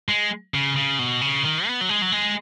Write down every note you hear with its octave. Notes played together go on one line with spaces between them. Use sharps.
G#3
C#3
C#3
B2
C#3
D#3
B3
F#3
G#3
F#3
G#3